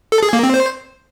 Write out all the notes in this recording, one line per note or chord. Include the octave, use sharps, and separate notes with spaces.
A4
G#4
A#3
C4
C5